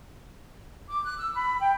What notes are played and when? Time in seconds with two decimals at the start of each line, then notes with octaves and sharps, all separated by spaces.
0.89 D6
1.04 F#6
1.17 E6
1.33 B5
1.59 G5